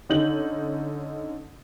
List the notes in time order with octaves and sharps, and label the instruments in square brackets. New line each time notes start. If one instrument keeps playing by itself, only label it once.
[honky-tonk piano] D3 C#4 D#4 G6 F#7